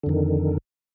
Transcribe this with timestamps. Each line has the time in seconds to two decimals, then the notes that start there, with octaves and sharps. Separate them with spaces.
0.03 D3
0.06 F2
0.09 D#3